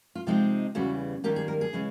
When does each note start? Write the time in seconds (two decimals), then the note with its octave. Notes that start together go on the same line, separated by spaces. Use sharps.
0.15 F4
0.27 C3 F3 G#3 C4 D#4 F4
0.75 E2 C#3 E3 G3 F#4
1.24 D#2 D#3 G3 A#3 G4
1.36 G#4
1.48 A#4
1.61 G#4
1.73 C#3 E3 G#3 C#4